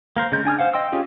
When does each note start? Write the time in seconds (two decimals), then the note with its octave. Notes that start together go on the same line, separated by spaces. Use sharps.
0.17 A#3 A#4 C5
0.32 C#3 G#3 G6
0.45 D4 G#5 D#6 F6
0.59 C5 F5 F#5
0.74 D#5 G5 C6 E6
0.92 C#4 F4 G4 G#4